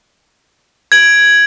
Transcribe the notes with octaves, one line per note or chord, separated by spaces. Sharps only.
G#6 D7 F#7